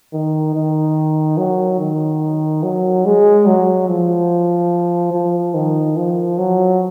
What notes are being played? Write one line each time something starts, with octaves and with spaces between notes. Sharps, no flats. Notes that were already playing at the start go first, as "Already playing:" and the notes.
D#3
D#3
F#3
D#3
F#3
G#3
F#3
F3
F3
D#3
F3
F#3